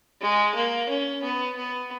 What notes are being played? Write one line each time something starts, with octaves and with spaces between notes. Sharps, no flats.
G#3
A#3
C#4
B3
B3